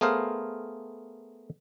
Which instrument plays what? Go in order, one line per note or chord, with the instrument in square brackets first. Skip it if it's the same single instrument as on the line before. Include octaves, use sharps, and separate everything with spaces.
[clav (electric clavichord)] A3 B3 G#4 A#4 C5 F5